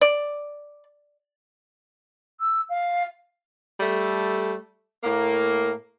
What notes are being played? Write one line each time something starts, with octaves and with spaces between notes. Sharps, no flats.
D5
E6
F5
G3 A3 A4
A2 A#3